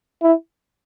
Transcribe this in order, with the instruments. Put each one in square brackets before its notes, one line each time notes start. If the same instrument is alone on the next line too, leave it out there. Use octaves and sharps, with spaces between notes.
[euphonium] E4